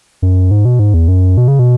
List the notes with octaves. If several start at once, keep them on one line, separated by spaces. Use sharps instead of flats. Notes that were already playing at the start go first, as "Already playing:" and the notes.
F#2
G#2
B2
G#2
E2
F#2
B2
C#3
B2